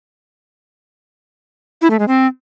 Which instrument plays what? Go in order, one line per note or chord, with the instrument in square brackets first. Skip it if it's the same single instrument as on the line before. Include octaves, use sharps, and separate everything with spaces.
[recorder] E4
A3
G#3
C4